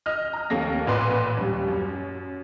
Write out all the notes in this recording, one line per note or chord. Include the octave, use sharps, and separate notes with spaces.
D#5 F6
A#5 F6
D#2 A3 A#3 A#6
A1 A#2 B4 C6 D6
D#2 G3
F#2